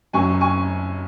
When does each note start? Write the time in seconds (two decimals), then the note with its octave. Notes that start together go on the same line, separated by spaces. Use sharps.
0.13 F#1 F#2 F#3 G#5 C#6
0.41 G#5 C#6